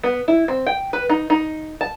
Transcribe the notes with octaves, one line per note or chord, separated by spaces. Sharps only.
B3
E4
C4
G5
B4
D#4
D#4
A5